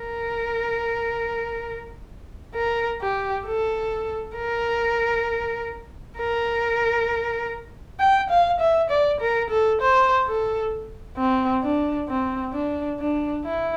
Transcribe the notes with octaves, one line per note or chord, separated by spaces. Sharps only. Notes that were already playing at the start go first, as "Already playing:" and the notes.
Already playing: A#4
A#4
G4
A4
A#4
A#4
G5
F5
E5
D5
A#4
A4
C5
A4
C4
D4
C4
D4
D4
E4